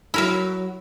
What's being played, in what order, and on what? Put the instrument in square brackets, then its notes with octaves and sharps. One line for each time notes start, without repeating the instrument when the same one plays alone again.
[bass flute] F#3 [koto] E4 A#4 E5